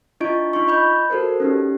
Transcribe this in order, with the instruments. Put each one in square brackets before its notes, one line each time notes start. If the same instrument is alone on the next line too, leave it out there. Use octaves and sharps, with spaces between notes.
[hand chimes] D4 E4 F4 D#5 C#6 D7
D#4 F4 C6 C#6
D#5 B5 G6
F#4 A4 A#4 C5
C#4 D#4 G4